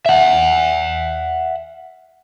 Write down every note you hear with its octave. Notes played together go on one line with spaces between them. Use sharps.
E5 F#5